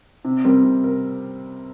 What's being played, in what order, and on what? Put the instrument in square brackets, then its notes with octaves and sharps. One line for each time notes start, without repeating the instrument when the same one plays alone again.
[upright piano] C3
G3 C4 G4 A#4
C3
A#4